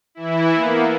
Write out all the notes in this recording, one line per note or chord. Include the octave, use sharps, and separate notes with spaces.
E3 E4
A#3 B3